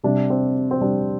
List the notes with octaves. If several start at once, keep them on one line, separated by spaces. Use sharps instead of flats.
C3 G3 D4
C4
C4
C3 G3 D4